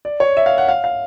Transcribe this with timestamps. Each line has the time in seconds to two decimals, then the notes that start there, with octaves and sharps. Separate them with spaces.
0.05 D5
0.20 C#5
0.37 E5
0.46 F5
0.58 F#5
0.68 F5
0.84 F5